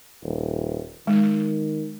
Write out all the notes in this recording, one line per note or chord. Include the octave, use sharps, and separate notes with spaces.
D#1
D#3 G#3